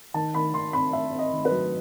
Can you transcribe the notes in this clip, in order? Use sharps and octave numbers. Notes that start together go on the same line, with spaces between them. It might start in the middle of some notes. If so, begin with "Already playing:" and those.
D#3 A5
D#3 B5
D#3 C6
C4 B5
C4 E5
C4
D#5
D#3
B4
F#3